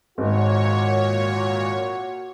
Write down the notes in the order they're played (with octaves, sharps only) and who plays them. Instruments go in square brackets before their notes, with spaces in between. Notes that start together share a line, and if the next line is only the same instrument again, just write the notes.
[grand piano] G#1 [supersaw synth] A#2 C#5 [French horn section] F#4